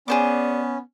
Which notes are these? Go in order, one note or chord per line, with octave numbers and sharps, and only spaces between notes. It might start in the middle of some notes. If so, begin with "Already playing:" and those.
B3 C#4 G#4 C5 D5 D6